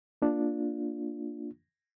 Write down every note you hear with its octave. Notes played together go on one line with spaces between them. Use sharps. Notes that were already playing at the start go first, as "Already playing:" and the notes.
A#3 D4 F4